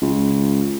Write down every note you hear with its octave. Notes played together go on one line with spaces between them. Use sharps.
C#2